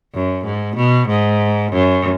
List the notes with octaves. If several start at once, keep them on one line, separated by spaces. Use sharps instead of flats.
F#2
G#2
B2
G#2
F#2